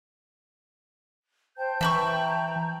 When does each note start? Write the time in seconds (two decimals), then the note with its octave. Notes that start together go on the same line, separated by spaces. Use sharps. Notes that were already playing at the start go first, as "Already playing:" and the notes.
1.57 C5 G5 A5 G6
1.81 E3 E5 A#5 B5 C#6